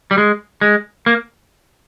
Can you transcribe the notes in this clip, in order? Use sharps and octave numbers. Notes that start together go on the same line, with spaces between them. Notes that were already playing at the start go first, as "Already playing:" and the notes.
G3
G#3
G#3
A#3